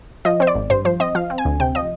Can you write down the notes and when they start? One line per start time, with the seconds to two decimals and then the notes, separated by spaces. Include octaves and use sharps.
0.25 F3 D#5
0.40 C4 C5
0.47 D5
0.55 G#1
0.70 G2 C5
0.85 F3 C5
1.00 C4 D#5
1.15 F3 F5
1.30 C4
1.38 G#5
1.45 D2
1.60 C3 G5
1.75 F3 D#5